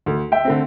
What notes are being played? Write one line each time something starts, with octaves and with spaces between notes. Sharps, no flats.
D2
E5 G5
D3 A3 C4